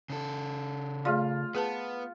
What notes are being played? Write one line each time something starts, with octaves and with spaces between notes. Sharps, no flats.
C#3 A4
A3 F4 G#4 D5
B3 G#4 B4 A5